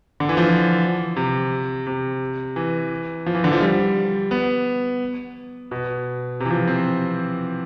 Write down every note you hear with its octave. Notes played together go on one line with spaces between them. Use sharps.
D3
E3
F3
C3
C3
E3
F3
E3
D3
F3
G3
B3
B2
C3
E3
F3
C4